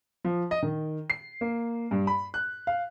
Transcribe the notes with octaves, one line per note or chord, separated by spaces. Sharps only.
F3
D#5
D#3
C7
A#3
G2
B5
F#6
F5